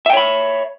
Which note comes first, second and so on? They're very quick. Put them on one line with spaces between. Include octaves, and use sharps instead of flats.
E5 G5 C#5 B5